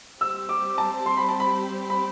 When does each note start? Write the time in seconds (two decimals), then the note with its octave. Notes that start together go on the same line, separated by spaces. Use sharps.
0.21 G3 C4 G4 C5 E6
0.49 D6
0.78 A5
1.06 C6
1.17 B5
1.28 A5
1.40 B5
1.90 B5